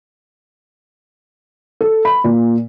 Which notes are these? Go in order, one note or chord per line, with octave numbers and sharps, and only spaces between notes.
A4
B5
A#2